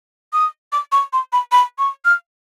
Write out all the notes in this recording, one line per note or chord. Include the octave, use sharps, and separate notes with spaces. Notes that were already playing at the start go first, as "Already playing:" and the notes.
D#6
D6
C#6
C6
B5
B5
C#6
F6